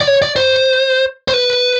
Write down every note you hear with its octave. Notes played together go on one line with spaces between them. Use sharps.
D5
C#5
D5
C5
C5
B4